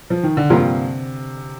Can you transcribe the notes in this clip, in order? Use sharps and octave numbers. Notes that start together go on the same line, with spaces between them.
F3
D#3
D3
G2 C3 F3 A#3 F4